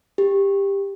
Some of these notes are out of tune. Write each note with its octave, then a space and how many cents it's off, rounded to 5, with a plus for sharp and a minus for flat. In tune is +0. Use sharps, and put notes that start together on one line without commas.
G4 +15